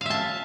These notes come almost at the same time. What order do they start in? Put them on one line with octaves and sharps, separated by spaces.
F5 E5 A5